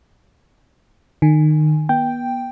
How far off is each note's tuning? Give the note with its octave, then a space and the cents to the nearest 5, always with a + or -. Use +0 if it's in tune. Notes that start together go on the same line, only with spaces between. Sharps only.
D#3 -25 G#5 +0
B3 -35 G5 +0